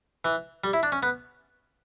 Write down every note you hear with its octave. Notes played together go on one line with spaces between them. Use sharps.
E3
G3
E4
D4
C#4
B3